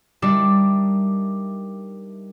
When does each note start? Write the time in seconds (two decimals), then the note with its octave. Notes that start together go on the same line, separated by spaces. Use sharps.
0.22 G3 D4 D#4 A#4 D5 E5